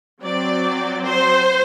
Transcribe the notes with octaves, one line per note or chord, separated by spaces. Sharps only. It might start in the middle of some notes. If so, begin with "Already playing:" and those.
F#3 C4 D5
C5